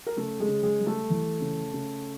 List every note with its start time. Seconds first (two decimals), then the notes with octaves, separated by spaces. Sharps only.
0.07 A#4
0.16 C#3 A3 A4
0.40 G#3 G#4
0.48 C#3
0.63 G#3 G#4
0.79 G3
0.86 A3 A4
1.10 E3
1.41 C#3
1.73 C#3